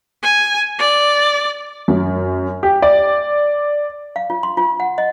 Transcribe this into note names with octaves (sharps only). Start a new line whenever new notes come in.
G#5
D5
F#2
G4
D5
F5
F4
C6
F4
F#5
D#5